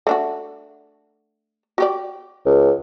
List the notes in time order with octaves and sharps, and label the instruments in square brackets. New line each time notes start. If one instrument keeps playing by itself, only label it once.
[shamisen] A3 D4 F#4
F#4 G4 D5
[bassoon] C#2